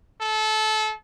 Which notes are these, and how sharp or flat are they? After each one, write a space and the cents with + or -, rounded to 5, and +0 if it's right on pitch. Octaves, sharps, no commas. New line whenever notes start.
A4 -25